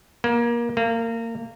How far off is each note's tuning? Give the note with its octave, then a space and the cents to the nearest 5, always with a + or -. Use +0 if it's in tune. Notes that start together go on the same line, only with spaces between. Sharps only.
A#3 +25
A#3 -25